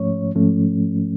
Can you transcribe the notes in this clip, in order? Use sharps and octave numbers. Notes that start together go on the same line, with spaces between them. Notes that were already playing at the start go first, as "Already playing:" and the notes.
Already playing: G#2 F3 A3 C#4 C#5
G#2 F3 A3 C#4